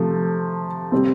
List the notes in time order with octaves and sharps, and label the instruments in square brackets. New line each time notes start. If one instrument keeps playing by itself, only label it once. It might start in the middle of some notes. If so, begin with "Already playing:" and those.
Already playing: [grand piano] C3 F3 A3
C3 G3 C4